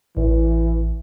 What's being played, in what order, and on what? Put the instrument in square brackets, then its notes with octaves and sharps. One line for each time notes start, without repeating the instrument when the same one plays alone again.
[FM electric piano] A1 [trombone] E3